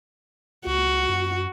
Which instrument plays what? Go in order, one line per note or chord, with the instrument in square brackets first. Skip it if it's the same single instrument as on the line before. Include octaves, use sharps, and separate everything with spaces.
[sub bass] C#2 [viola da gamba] F#4
[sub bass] F#2